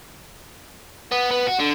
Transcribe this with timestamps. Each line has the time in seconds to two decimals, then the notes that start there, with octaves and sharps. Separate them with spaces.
1.12 B3
1.31 B3
1.47 F#4
1.59 D3